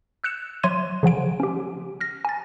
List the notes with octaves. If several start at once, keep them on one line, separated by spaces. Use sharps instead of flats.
E6 F#6 C#7 E7
F#3 E5 C6 G#6 D#7
C#3 F3 F#5 D7
C#4 G4
F6 A#6
G#5 A6